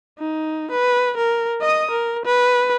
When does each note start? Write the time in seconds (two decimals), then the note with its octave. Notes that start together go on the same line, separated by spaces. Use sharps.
0.19 D#4
0.71 B4
1.17 A#4
1.61 D#5 D#6
1.91 A#4
2.25 B4